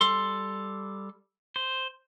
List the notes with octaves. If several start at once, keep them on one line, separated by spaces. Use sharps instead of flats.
G3 A4 C6
C5